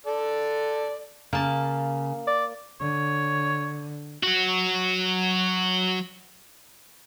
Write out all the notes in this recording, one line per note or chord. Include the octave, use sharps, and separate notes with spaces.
A4 D5
C#3 A#3 A5
D5
D3 C#5
F#3 F#4